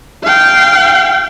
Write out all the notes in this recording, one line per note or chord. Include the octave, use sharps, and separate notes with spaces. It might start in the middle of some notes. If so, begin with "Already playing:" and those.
F5 G5